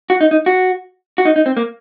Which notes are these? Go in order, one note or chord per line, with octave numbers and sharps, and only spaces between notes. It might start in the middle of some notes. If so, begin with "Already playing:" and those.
F#4
D#4
D#4
F#4
F#4
D#4
D#4
C4
A#3